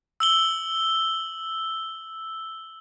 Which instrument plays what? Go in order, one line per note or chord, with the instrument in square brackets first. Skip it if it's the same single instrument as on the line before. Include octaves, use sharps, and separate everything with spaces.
[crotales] E6 F#7 G7